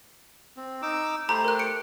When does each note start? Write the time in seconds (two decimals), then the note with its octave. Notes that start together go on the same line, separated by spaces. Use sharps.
0.57 C4
0.82 D#4 D6 E6
1.29 A3 G4 C5 A#5 B5
1.45 A#4 F#6
1.59 C#7 D7